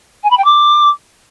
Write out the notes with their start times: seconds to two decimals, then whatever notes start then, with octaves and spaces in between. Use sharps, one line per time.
0.23 G#5
0.30 B5
0.37 G5
0.44 D6